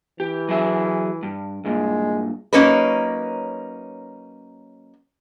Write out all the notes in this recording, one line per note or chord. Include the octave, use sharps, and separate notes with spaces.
E3 G4
F#3 G#4 E5
G2
G2 A#2 G#3
F#3 A#3 C#4 D#4 A#4 B4